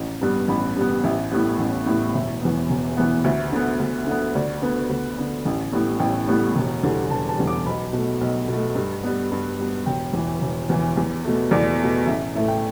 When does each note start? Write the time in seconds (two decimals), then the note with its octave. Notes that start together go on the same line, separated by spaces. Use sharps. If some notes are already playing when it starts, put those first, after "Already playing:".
Already playing: A1
0.21 G2 G3 B3
0.48 A1 B5
0.76 G2 G3 B3
1.04 A1 E5
1.31 A2 G3 B3
1.59 A1
1.86 A2 G3 B3
2.14 E1 E5
2.41 E2 E3 B3
2.70 E1
2.97 E2 E3 B3
3.24 D2 E5
3.52 D3 B3
3.79 D2
4.07 D3 B3
4.35 D2 D5
4.62 D3 B3 B4
4.89 D2
5.18 D3 B3
5.45 A1
5.73 A2 G3 B3
6.00 A1 G5
6.28 A2 G3 B3
6.56 E1
6.83 E2 D3 G3
7.10 E1 A5
7.29 A5
7.37 E2 D3 G3
7.47 D6
7.66 B1 B5
7.93 B2 A3
8.21 B1
8.48 B2 A3
8.75 G2
9.03 G3 B3
9.32 G2
9.59 G3 B3
9.86 E1 G5
10.13 E2 E3
10.41 E1
10.69 E2 E3
10.97 E2
11.25 B2 A3
11.51 E2 D5
11.79 B2 A3
12.06 A1 E5
12.35 A2 A3 E5
12.48 G5